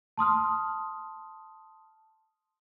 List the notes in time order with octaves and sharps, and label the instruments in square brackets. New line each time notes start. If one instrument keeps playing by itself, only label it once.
[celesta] A5 C6 D#6 F6